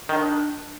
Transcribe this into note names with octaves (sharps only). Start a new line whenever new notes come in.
D#3 D4